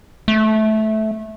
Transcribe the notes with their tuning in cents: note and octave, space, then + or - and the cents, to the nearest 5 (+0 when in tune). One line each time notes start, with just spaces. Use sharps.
A3 -15